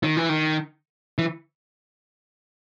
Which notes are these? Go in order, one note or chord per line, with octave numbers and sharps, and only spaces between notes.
D#3
E3
D#3
E3